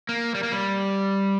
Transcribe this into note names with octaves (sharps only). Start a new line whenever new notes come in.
A#3
G3
A#3
G3